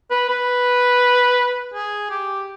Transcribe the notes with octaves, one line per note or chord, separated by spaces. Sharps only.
B4
B4
G#4
G4